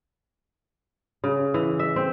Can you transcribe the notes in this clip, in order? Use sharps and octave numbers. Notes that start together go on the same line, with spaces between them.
C#3
E3
E5
C4